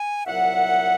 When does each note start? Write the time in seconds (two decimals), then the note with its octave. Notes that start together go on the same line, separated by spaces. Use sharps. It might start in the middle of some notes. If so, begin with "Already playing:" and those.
Already playing: G#5
0.26 C2 A#2 F#3 E5 F#5